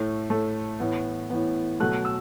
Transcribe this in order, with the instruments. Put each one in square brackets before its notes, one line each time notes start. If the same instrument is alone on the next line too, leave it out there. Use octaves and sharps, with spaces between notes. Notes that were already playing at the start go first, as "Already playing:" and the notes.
Already playing: [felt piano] A2 A3
A2 A3
A2 E3 B3
A2 E3 B3
B2 F#3 A3 F#6
E6